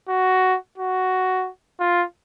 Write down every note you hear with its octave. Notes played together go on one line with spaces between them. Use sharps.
F#4
F#4
F4